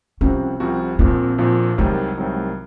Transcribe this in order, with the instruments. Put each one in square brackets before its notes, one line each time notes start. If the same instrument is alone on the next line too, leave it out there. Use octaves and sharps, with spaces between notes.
[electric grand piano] C2 C3 F3 C4 F#4 [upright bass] C#4
[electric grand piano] C2 C3 F3 C4 F#4
[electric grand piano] A#1 A#2 F3 [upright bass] C4
[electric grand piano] A#1 A#2 F3
[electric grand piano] C2 C3 D#3 F#3 [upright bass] G#3
[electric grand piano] C2 C3 D#3 F#3